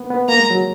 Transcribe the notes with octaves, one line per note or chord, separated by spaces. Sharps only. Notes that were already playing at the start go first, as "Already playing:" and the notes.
Already playing: A#3 B3
B3
A#3 A#5
G#3
F#3